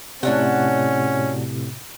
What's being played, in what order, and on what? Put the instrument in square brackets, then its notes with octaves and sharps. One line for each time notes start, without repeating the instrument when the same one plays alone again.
[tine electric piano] A2 C3 [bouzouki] F#3 D4 F#5 [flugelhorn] C#4